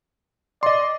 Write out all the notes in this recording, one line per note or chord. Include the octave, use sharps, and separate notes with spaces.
D5 D#5 C6